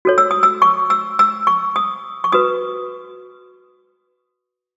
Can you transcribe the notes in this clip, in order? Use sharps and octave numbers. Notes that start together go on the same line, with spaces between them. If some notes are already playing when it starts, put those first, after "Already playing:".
F#4 A4 C#5
E6
D#6
E6
C#6
E6
E6
C#6
D#6
C#6
F#4 B4 D#6